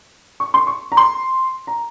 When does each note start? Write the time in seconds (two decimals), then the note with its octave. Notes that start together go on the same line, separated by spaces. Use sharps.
0.40 C#6
0.54 C6
0.67 C#6
0.92 A#5
0.97 C6
1.67 A#5